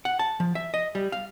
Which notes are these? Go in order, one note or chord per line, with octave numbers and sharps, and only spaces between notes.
F#5
A5
F3
E5
D#5
G3
F5